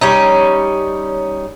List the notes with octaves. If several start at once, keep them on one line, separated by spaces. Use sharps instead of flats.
G3 C#4 D#4